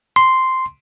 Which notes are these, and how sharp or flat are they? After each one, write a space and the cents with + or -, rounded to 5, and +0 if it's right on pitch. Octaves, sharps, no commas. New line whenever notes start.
C6 -5